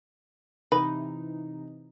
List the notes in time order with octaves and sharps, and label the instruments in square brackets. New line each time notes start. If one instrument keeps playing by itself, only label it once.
[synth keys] C3 E3 D#4 [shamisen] B4